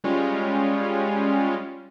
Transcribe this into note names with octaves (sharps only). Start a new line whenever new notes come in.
G3 G#3 C#4 F4